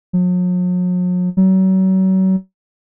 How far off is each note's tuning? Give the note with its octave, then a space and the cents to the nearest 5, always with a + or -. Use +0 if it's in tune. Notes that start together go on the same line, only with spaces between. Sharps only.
F#3 -45
F#3 +35